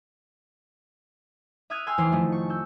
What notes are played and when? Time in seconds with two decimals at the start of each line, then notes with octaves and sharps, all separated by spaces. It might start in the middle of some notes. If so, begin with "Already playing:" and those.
1.70 E5 D#6 F6 F#6 G#6 D#7
1.87 G5 G#5 C6 E6 F6
1.98 F1 E2 E3 C5 C6
2.12 D#3 F3 A3
2.32 C#6
2.50 E6 G6